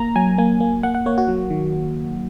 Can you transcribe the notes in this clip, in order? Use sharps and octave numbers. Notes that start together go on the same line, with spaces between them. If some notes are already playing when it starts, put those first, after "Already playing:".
Already playing: A#3 A#5
F#3 G#5
A#3 G#5
A#3
A#3 F#5
F#5
A#3 C#5
F#4
F#3
D#3